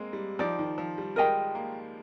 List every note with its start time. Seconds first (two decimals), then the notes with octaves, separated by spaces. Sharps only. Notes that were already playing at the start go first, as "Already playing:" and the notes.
Already playing: G#3 A#3 C4
0.13 G3
0.39 F3 D#4 G4 D5
0.59 D#3
0.78 F3
0.98 G3
1.16 G#3 A#4 D#5 G5
1.55 A#3